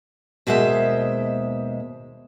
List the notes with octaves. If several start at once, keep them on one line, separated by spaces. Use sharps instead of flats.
D#2 B2 G#3 C5 E5